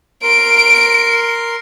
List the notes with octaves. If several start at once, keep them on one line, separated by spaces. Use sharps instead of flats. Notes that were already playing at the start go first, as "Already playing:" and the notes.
A#4 C6 D7